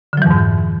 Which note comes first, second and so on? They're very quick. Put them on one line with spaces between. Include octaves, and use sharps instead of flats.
D3 F#3 E3 F2 G#2